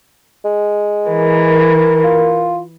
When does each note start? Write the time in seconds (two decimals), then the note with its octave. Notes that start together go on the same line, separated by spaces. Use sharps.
0.45 G#3
1.08 E3 A#4
2.04 F4